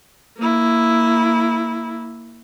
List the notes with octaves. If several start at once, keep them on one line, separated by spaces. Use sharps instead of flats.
A#3 E4